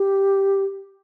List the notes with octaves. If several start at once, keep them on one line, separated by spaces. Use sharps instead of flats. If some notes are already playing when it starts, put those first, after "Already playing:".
Already playing: G4